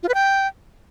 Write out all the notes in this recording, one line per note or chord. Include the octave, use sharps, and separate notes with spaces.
F4
B4
G5